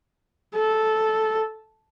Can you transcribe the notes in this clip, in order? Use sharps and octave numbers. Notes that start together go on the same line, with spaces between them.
A4